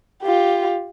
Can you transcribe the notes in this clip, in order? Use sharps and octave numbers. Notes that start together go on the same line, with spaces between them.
F4 G4